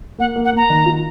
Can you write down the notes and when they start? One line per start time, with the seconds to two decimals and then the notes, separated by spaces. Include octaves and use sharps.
0.18 A#3 F#5
0.36 A#3
0.45 F#5
0.53 A#3 A#5
0.70 D#3
0.86 F4